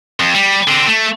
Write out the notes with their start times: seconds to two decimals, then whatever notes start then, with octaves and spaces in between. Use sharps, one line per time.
0.20 F2
0.35 G3
0.67 D3 C4
0.87 A3